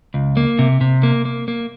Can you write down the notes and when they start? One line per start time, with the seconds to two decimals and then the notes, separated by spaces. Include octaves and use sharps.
0.14 C#2
0.37 A#3
0.59 C3
0.81 C3
1.03 A#3
1.25 A#3
1.48 A#3